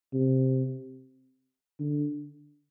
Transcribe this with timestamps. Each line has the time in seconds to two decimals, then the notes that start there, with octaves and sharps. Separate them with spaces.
0.13 C3
1.80 D3